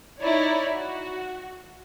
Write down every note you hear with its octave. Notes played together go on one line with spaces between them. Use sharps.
D#4 E4 C#5 D5
F#4